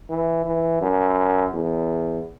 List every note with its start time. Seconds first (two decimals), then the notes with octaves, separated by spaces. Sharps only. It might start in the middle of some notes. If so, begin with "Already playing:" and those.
0.10 E3
0.46 E3
0.82 F#2
1.54 E2